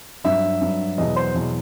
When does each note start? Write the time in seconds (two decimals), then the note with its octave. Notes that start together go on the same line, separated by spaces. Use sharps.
0.24 G2 F#3 E5
0.61 G2 F#3
0.98 E2 B2 F#3 D#5
1.16 C5
1.34 E2 B2 F#3